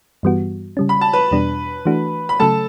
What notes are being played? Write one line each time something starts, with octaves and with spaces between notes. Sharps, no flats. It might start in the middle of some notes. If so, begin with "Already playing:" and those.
G2 E3 G3 B3 F#4
C#3 G3 C#4
B5
A5
B4 B5
E2 B2 G3 D4
E3 A3 D4 F#4
B5
C#3 F#3 A3 A4 A5